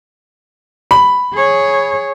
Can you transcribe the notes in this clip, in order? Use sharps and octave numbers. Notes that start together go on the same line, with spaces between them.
B5
G#4 C#5